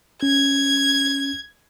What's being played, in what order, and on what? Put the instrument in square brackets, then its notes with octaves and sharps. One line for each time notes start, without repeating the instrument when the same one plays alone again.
[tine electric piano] C#4 [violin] G#6